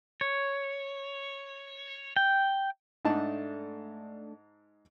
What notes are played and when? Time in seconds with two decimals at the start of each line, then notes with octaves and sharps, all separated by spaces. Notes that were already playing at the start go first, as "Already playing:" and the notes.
0.21 C#5
2.16 G5
3.05 G#2 A3 D4 D#4 A5